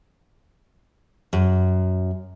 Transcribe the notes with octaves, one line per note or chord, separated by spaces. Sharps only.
F#2